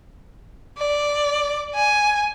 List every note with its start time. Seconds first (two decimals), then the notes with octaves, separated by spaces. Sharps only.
0.78 D5
1.75 G#5